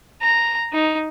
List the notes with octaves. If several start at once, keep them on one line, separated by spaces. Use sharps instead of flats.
A#5
D#4